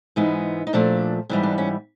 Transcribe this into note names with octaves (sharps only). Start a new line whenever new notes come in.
G#2 E3 G#3 B3 D#4
D#4
A#2 F3 A3 D4
G#2 E3 G3 B3 D4
D4
C#4